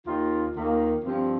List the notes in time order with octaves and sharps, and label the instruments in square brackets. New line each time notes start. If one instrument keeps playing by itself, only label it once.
[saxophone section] D#2 D#3 A#3 F4
D#2 D#3 A#3 F4
G2 F3 C4